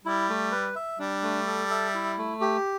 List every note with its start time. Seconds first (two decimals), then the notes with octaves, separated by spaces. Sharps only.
0.05 G3 E4
0.29 A3
0.52 B4
0.76 E5
0.99 G3 D4
1.23 A3
1.47 A4
1.71 E5
1.94 E4
2.18 A3
2.41 G4